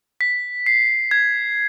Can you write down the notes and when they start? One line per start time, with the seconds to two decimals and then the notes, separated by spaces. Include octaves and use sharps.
0.21 B6
0.66 C7
1.11 G#6